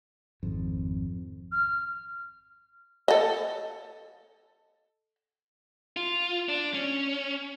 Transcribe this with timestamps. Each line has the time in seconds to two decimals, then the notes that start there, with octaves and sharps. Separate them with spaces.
0.43 G#1 F2
1.52 F6
3.08 A4 D#5
5.97 F4
6.49 D4
6.74 C#4